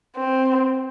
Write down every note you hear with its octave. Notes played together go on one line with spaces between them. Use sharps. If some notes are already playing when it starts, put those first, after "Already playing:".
C4